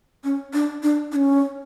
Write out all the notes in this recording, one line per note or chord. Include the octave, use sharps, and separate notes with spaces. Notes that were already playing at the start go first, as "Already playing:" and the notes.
C#4
D4
D4
D4
C#4